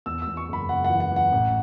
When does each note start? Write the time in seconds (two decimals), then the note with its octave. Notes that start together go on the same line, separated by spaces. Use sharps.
0.06 E2 E6
0.22 E6
0.27 E2
0.37 C#6
0.49 F#1 B5
0.69 F#1 F#5
0.84 F#5
0.90 E3
1.00 F#5
1.12 E3 F#5
1.32 A1